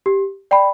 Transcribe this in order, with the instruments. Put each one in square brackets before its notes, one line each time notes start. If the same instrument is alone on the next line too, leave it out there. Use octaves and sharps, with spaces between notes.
[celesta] G4
D5 G5 B5